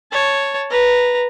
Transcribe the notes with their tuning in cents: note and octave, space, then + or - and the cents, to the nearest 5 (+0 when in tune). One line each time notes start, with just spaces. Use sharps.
C#5 +0 A5 +0
B4 -10 A#5 -10